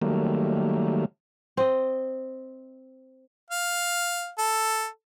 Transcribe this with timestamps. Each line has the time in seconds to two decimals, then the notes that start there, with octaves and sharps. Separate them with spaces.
0.02 D#3 F#3 G3 A3 A#3
1.57 C4 D#5
3.50 F5
4.38 A4